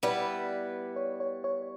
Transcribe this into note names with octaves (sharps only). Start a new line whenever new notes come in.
G3 B3 E4 B4 D5
C#5
C#5
C#5